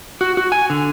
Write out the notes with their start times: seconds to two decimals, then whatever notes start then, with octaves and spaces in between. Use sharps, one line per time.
0.21 F#4
0.37 F#4
0.52 G#5
0.70 D3